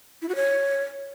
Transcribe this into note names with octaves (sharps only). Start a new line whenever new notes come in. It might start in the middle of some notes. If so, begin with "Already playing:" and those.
E4
F#4
C#5